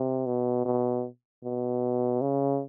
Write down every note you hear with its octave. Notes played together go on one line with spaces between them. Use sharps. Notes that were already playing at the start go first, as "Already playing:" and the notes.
Already playing: C3
B2
B2
B2
C#3